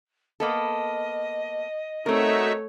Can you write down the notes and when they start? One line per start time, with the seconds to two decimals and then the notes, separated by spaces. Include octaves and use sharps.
0.40 A#3 B3 A4 D#5
2.06 A3 C4 D#4 F#4 A#4 C#5 E5